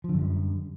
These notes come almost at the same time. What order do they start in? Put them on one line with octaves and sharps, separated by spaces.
F3 D3 F#2 G3